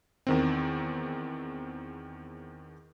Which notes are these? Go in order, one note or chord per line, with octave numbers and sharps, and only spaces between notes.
E2 D#3 C4